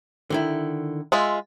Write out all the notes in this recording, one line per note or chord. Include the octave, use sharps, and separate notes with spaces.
D3 D#3 E4
G#3 F4 E5